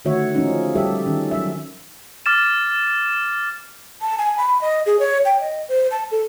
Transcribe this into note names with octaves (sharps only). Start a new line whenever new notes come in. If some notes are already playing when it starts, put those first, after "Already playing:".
D3 D#3 A3 F#4 C#5 E5
F3 G#3 C#4 D#4
G3 G4 A4 E5
D#3 C#4
F#3 E5
D6 F6 A6 E7
A5
G#5
B5
D#5
G#4
C#5
G5
D#5
C5
A5
A4